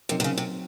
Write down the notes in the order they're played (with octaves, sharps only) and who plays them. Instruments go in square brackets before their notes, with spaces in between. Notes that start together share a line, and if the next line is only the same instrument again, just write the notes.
[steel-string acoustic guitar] C3 [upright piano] F#3 C4 D#4 A#4
[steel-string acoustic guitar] C3
C#3
C3